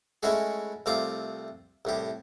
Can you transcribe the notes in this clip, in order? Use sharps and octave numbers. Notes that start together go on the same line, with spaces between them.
G#3 A3 C#4 E4 F#4 G#4
C2 A3 C4 F4 D6
C2 A2 G4